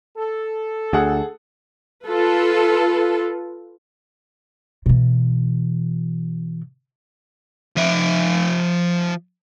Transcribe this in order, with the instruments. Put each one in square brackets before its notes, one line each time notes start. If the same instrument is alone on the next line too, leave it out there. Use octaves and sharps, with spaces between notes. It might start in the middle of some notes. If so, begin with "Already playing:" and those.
[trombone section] A4
[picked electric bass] D2 [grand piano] G#4 F#5
[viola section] F4 A4 B4
[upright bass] B2 E3
[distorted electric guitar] F3 E5